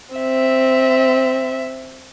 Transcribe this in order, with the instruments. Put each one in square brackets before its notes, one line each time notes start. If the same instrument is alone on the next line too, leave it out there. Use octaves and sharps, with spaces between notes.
[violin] C4 E5